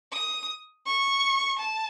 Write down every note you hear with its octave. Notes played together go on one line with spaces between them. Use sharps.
D#6
C#6
A5